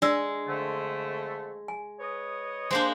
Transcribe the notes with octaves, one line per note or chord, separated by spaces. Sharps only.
G#3 D4 D5 E6
F2 D3 A3
G#5
B4 C#5 D#5
G#3 A#3 D4 C5